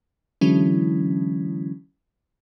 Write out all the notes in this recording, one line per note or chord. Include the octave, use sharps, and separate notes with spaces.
D3 E3 F#3 G#3 C#4 E4